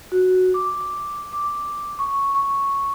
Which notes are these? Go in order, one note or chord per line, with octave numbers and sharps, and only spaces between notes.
F#4
D6
D6
C#6
C#6